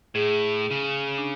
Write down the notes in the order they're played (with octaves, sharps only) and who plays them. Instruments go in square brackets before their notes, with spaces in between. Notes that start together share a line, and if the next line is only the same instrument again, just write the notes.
[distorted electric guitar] A2 [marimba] G#4
[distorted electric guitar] C#3
[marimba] D4